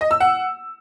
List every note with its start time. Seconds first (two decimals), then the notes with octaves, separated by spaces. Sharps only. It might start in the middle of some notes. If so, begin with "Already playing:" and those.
0.01 D#5
0.11 E6
0.20 F#5